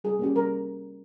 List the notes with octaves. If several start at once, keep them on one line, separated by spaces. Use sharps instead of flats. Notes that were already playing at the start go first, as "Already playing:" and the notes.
G3 G#4
A#3 C#4 G4
G3 A#4